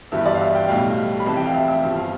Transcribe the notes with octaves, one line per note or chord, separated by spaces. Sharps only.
G1 G2 E3 G3 E5
D5
F5
E5
G5
B1 A2 G3 F5
B5
F1 F2 E3 A5
G5
F5
E5
E5
G1 G2 F3
F5